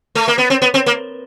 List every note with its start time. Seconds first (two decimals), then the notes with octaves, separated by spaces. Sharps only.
0.15 A3
0.28 A#3
0.38 B3
0.50 C4
0.62 B3
0.74 C4
0.86 A#3